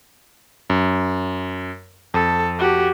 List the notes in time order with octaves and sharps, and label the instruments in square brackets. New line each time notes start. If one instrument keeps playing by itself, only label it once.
[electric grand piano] F#2
[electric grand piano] F2 [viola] A4
[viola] F#4 G4